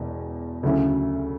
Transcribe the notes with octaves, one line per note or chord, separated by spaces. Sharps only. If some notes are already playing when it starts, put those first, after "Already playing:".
Already playing: E1 E2 B2
D2 C#3 F#3 C#4 E4